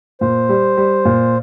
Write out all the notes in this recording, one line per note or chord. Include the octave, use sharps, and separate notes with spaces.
A#2 C5
G3
G3
A#2